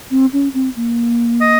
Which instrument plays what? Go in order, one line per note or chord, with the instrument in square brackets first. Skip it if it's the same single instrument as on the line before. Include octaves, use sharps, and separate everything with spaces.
[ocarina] C4
C#4
C4
A#3
[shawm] D#5